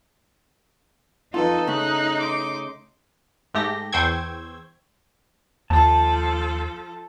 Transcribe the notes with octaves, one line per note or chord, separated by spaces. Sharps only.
F2 D#4 F4 A4 B4
C#3 A3 A#5 F#6
C6 D6
G#2 A3 G4 A#6
E2 C5 G5 C#6 E6 G#6
D#2 F3 A4 A5